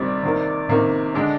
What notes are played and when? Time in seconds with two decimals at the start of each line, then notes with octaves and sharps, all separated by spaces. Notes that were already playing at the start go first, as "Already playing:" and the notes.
Already playing: C3 D#3 G3 D5
0.23 C3 D#3 A#3
0.69 C3 D#3 A#3
1.14 D3 G#3 D4 D5